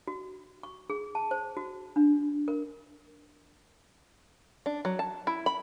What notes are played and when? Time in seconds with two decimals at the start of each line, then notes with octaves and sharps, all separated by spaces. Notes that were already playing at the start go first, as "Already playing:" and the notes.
0.07 F#4
0.63 C#6
0.90 G#4
1.15 A5
1.31 C5
1.57 F#4
1.96 D4
2.48 A#4
4.66 D4
4.85 F#3
4.99 A5
5.27 E4
5.46 B5